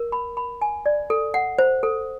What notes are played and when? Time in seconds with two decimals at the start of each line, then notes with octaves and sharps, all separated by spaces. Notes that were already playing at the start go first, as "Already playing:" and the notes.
Already playing: A#4
0.12 B5
0.37 B5
0.61 G#5
0.86 D5
1.10 A4
1.34 F#5
1.58 C5
1.83 A4